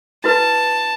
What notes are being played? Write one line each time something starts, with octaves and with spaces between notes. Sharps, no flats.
E4 F#4 B4 A5